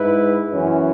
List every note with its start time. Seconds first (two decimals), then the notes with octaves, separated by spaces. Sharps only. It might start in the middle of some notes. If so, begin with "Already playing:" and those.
Already playing: G#2 G#3 E4 B4
0.52 F#2 E3 C#4